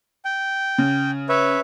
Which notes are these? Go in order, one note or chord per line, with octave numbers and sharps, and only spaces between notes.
G5
C#3
B4 C#5 E5